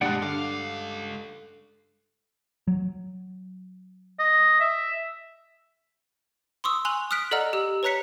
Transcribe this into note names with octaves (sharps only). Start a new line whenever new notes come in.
G2 B2 G3 G#3 D5 F#5 A5 F#6
C#2 D3 F5 D6
F#3
D#5
E5
C6 C#6 D#6 E6
G#5 C6 F#6 F7 F#7
D#6 F6 F#6 B6 D7
A4 D5 D#5 F#5 A#5 F6
G4 E6
B4 C#5 A#5 F#6 B6 C#7